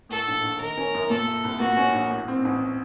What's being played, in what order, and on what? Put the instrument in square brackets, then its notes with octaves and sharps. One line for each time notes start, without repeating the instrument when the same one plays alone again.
[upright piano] A2 [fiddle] A4
[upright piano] A#1
A#1
[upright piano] D#3 [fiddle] A#4
[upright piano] C#4
F#2
[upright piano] A#2 [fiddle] A4
[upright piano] A3
C2
[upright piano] A#2 [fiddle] F#4
[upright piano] C#4
A#1
A2
C4
A1